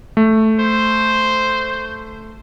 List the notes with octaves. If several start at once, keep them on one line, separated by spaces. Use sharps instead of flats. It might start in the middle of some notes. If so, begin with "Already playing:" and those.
A3
C5